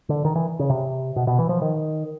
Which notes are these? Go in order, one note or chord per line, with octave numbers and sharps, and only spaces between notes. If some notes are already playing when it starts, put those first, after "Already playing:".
D3
D#3
E3
C#3
C3
B2
B2
E3
F3
D#3